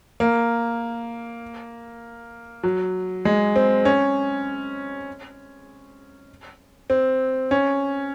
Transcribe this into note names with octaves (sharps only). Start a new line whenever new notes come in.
A#3
F#3
G#3
C4
C#4
C4
C#4